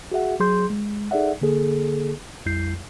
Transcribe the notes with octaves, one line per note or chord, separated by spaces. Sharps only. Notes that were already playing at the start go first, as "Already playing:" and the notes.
F#4 G#4 E5 F#5
F#3 G#4 C6 G6
G#3
D#4 G#4 A4 D5 E5 F#5
D3 A#3 G#4 A4
A#1 F2 G3 E4 G6 C7